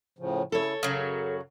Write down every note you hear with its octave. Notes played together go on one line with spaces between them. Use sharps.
A2 C#3 F3
C#3 E4 A4 C#5
F#2 C#3 F#3